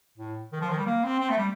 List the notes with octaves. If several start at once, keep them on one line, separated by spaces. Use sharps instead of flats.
A2
D#3
F3
D#3
G3
A#3
C4
C4
A3
G3